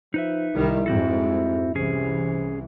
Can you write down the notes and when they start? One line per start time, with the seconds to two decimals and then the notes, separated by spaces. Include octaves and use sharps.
0.14 F3 D#4 B4 E5
0.54 C2 D#3 G3 E4
0.86 F2 G#2 C4 F#4 A4
1.75 C2 C3 E3 C#4 G#4